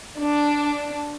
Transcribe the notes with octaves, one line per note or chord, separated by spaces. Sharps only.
D4